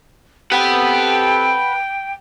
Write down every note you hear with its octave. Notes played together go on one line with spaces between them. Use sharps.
C4 G4 A4 B4 F#5 G5